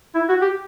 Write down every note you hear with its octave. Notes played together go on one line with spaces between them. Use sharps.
E4
F#4
G4